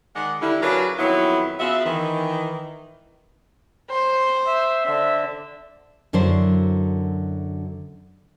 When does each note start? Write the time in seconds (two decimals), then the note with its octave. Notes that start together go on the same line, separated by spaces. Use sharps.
0.15 D#3 G#3 D5 F#5
0.41 D3 G3 E4
0.62 C#3 F#3 D4 A#4 B4 C#5
0.99 F2 D#3 F#3 B3 E4
1.60 C#3 B3 F4 F#4 E5
1.86 D#3 E3
3.90 C5
4.47 E5
4.86 D3 E5
6.13 F#2 D3 F#3 E4 C5